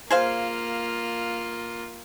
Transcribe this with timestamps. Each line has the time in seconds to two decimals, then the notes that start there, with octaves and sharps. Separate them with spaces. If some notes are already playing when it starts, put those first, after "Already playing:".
0.10 A#3 F4 G#4 C5 F5